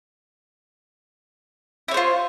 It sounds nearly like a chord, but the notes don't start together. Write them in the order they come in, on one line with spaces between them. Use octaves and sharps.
E4 C#5 C5 F4